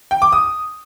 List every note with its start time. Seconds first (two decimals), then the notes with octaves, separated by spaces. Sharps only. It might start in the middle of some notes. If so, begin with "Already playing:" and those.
0.11 G5
0.22 D6
0.32 D#6